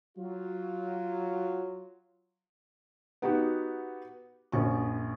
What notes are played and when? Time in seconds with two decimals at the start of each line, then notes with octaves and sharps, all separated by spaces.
0.17 F#3 F4
3.22 B3 D#4 F#4 G4
4.52 A#1 F#2 C#6